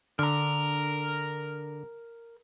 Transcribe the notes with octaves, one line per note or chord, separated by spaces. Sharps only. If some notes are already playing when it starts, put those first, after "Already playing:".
D3 A#4 A#5